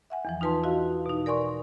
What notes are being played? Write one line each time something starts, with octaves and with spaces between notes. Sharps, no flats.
E5 F#5 G#5
E2 E3 F3
D#4 F4 B4 A5 C6
E4 F#4 D#5 F5 A5
B2 D#4
A#4 D5 G#5 C6 C#6